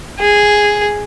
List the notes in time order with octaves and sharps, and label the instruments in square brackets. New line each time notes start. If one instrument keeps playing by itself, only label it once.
[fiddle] G#4